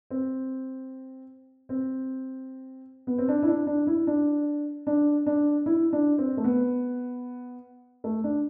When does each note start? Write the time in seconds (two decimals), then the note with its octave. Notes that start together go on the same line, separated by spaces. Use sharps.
0.11 C4
1.69 C4
3.07 B3
3.18 C4
3.28 D4
3.43 E4
3.47 D4
3.67 D4
3.87 E4
4.07 D4
4.87 D4
5.26 D4
5.66 E4
5.93 D4
6.18 C4
6.37 A3
6.44 B3
8.04 A3
8.24 D4